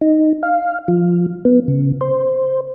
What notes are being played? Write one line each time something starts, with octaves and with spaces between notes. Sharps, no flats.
D#4
F5
F3
B3
C#3
C5